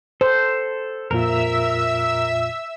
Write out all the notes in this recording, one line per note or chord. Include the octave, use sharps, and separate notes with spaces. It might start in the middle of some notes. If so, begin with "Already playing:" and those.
A4 C5
F2 A#2 F4 A#4 E5 E6